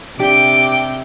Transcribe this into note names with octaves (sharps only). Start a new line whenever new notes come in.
C3 D4 G4 G5 D6